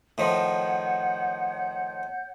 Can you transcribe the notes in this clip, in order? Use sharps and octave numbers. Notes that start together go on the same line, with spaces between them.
A2 D#3 F3 C#5 F#5 G6